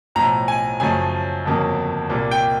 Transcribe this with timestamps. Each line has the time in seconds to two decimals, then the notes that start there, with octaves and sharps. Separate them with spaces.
0.15 B1 A2 F3 A#5
0.48 G#5
0.80 F#2 C#3 F3 A3 G#5
1.45 G1 F2 C#3 F#3 A#3
2.09 C2 A#2 G3 A#3
2.31 G5